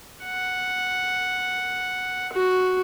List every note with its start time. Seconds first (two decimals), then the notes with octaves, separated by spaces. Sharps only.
0.25 F#5
2.33 F#4